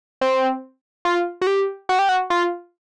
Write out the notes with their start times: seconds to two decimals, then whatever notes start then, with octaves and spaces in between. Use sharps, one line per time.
0.21 C4
1.05 F4
1.42 F#4
1.47 G4
1.89 F#4
1.99 G4
2.09 F#4
2.30 F4